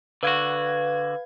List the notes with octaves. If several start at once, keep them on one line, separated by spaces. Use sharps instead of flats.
D3 F#4 B4 F5 G#6